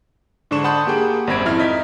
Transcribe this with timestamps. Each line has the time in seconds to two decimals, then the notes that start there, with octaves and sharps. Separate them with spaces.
0.51 G#2 D3 D4 C#6 E7
0.64 F#5 A5 B5 C6 D#6 G6
0.87 A#3 G4 G#4 F#5 G5
1.27 G#1 F#2 C4 B5 G#6 D7
1.45 F2 E4 F6
1.60 D#4 G#6 B6